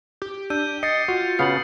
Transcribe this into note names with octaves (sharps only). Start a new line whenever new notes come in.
G4
D4 E6 G6 D#7
D#5 A6 C7 C#7
F4 F#4
C#3 B3 F5 A6 C7 F#7